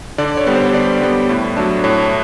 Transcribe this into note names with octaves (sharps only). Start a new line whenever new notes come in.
D3 D5
C#5
G3 B3
C5
D3 D5
G3 B3
A2
F#3 A3 D4
A2 C#5